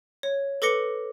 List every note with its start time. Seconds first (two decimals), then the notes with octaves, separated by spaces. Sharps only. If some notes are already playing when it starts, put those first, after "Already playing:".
0.23 C#5
0.62 A4 B4 D6 A#6 C#7 G7